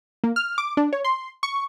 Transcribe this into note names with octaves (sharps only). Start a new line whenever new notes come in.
A#3
F6
D6
D4
C#5
C6
C#6